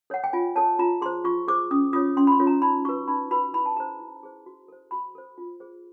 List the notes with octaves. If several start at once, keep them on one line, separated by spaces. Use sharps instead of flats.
A4 C#5 F#5
G5
F4 G#5
A4 C#5 A5
F4 A#5
G#4 C5 C6
F4 C#6
G#4 C5 D6
C#4 D#6
F4 A4 C#5 D#6
C#4 C6
B5
C6
F4 A4 C#5
A#5
D#4 B5
F#4 B4 C#6
D#4 B5
F#4 B4 B5
E4 B5
A5
G#4 C5 A#5
E4
G#4 C5
F#4
A4 C5
F#4 B5
A4 C5
F4
G#4 C5